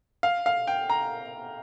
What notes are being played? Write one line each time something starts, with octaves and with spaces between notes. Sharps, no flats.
F5
F5
G5
A#5